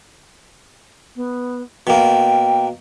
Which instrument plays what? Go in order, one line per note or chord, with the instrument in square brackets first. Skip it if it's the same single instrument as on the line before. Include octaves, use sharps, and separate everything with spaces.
[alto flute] B3
[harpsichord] B2 A#3 [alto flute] G5